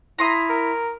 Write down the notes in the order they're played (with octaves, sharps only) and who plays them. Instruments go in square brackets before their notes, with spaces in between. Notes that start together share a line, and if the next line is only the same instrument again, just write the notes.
[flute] E4 [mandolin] A#5 C6 D#6
[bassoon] A#4